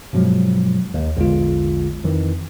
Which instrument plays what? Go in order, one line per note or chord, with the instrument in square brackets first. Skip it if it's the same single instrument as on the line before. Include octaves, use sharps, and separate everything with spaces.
[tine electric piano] G2 B2 F3 F#3 G#3
D#2
A#1 E2 D3 G#3 F4
F2 D#3 E3